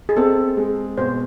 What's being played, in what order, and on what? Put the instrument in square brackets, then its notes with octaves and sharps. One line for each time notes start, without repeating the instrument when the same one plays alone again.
[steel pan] G#4
[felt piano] C4 [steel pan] A4
[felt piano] G#3
[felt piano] B2 [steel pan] C5